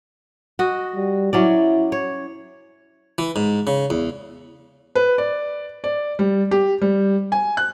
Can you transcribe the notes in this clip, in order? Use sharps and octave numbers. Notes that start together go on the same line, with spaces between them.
F#4 D#5
G3
F#3 C#4 E4 D5
C#5
E3
G#2
C#3
E2
B4
D5
D5
G3
G4
G3
G#5
F#6